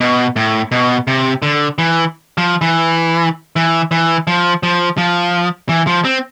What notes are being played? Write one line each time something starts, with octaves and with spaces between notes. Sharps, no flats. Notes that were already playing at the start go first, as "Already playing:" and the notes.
B2
A2
B2
C3
D3
E3
F3
E3
E3
E3
F3
F3
F3
E3
F3
C4